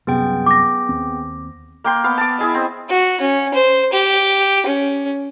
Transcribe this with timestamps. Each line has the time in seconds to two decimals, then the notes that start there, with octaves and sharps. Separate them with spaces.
0.07 C2 F#2 C3 B3 G#4 G5
0.46 D6 A#6
0.89 D#2 C4
1.84 A#3 G5 C6
2.04 B3 F5
2.18 A5 D6
2.38 E4 G#4 D#5
2.54 C4
2.90 F#4
3.20 C#4
3.54 C5
3.93 G4
4.66 C#4